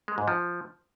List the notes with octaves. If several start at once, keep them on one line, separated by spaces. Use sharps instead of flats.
G#3
G#2
F3